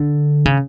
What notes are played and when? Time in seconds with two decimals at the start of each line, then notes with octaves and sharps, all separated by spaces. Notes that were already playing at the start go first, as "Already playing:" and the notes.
Already playing: D3
0.46 C#3